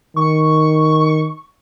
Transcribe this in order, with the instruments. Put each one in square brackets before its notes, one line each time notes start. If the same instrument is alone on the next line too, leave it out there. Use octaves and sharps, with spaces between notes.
[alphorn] D#3 [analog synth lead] C#6